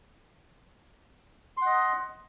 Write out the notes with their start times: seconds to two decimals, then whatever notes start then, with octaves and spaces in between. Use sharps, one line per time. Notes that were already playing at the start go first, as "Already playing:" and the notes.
1.57 C6
1.62 F#5
1.66 D#5